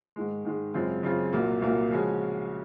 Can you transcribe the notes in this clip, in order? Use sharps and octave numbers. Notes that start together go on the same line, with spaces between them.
G#2 D#3 G#3
G#2 D#3 G#3
F#2 C#3 G#3 C4 F4
F#2 C#3 G#3 C4 F4
C2 A#2 F#3 A#3 F4
C2 A#2 F#3 A#3 F4
C#3 F3 G#3 C#4 F#4